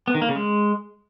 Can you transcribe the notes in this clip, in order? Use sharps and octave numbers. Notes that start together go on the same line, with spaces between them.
B3
D#3
A#3
C#3
G#3